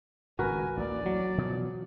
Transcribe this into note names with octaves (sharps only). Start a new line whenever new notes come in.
G#1 C#2 A2 F#4 A#4 B4 G#5
A1 D2 A#3 D5
F#3
B2 E3 F3